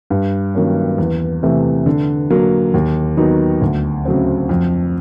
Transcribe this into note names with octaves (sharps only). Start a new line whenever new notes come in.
G2
D#3 F#3 A#3 C#4
E2
C3 E3 A3
D3
F#3 A#3
D#2
D#3 F#3 B3 D#4
D2
C#3 F#3 A3 C4
F2